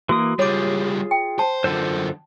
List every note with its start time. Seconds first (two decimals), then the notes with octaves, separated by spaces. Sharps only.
0.09 E3 A#3 F#4 D#6
0.39 C#2 G3 F4 G#4 C#5 D6
1.11 G5
1.39 C5 A5
1.64 F#2 D3 F4 A4 C5